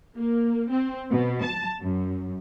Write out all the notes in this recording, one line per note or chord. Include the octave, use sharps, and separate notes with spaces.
A#3
C4
B2
A5
F#2